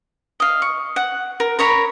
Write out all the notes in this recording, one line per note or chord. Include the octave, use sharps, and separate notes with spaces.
D#5 F5
C#6
F#5
A#4
A#4 C#5 A#5 B5